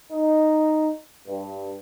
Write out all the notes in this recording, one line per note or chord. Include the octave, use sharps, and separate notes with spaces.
D#4
G2